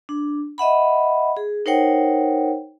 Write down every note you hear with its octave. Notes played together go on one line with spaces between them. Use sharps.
D4
D#5 E5 F#5 B5
G#4
D#4 A#4 C5 C#5 F#5 G5